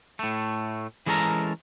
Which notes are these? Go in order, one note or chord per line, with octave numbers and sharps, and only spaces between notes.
A2 A3
E3 G#3 C#4 A4 A#4 A#5